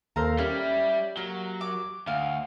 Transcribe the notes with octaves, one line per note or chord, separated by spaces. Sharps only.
D#2 A4 A#4 C5 F5 A#5
G3 C#4 E4 G4
F#3 A#3
D6
D2 F5